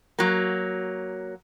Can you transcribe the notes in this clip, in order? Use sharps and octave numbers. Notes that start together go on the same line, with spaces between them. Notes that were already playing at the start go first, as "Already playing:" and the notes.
F#3 A#3